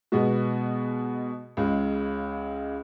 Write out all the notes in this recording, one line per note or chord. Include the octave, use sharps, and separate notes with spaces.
B2 G#3 B3 F#4
C#2 C#3 G#3